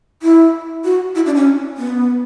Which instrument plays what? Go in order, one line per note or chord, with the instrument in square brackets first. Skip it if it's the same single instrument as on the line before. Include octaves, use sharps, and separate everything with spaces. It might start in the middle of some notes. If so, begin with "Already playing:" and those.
[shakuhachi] E4
F#4
E4
D4
C#4
B3